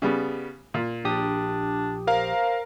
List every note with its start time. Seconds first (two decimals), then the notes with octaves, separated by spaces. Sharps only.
0.02 C#3 G3 B3
0.74 A#2
1.04 A#1 D4 G4 D#6
2.07 A#4 C5 F5 A#5